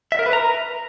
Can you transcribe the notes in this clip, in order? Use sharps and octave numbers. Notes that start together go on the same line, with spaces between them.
E5
A#4
B4
A#5